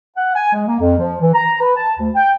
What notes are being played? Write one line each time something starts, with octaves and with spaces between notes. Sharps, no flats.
F#5
G#5
G#3
A#3
F2
F3
E3
A#5
B4
A5
D2
G5